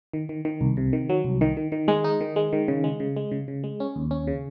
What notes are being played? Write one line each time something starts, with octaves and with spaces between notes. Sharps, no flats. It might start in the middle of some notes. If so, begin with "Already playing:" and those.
D#3
D#3
D#3
C2
C3
D#3
F#3
C2
D#3
D#3
D#3
G#3
D#4
D#3
G#3
D#3
C#3
G#3
C#3
G#3
C#3
C#3
G#3
C#4
D#2
C#4
C#3